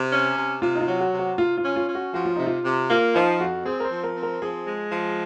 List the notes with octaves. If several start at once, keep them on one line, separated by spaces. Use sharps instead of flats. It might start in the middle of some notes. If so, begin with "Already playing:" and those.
Already playing: C3
C#4
C3
C3 F4
D#4
F4
F#3
F#4
C3
F#4
C3 F4
F4
C#4
F4
C#4
F#4
F3 F#4
F4
C3 D#4
F4
C3
A#3 F4
F3 D#4
F2 F#4
C4 G#4
A#4
C5
F3
A#4
C4
A#4
F3 G#4
G#3
F3